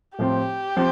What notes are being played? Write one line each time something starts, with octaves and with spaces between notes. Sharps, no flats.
A2 F3 C4 G4
F3 C4